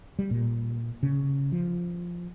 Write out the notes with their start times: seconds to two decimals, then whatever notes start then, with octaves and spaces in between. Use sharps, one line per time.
0.19 G3
0.31 A#2
1.03 C#3
1.52 F3